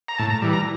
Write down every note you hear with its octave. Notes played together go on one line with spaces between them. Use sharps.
A#5
A2 A5
A#5
E3 G3
A#5